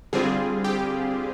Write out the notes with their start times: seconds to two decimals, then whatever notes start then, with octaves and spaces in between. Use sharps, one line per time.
0.13 D3 G3 C4 F4 G#4
0.64 G4